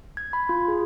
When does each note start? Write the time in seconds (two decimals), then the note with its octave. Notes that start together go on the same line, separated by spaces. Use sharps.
0.17 G#6
0.33 B5
0.49 F4
0.68 G#4